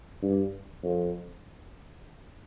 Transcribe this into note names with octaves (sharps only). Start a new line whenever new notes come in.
G2
F2